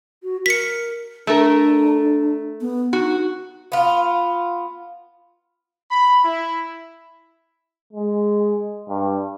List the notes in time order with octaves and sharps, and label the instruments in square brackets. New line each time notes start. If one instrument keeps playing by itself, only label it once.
[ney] F#4
[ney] A#4 [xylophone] B6 C#7
[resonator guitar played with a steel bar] A3 A4 A#4 [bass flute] D4
[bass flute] B3
[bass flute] D#4 [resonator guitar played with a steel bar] F#4
[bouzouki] B3 F4
[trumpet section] B5
E4
[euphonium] G#3
G2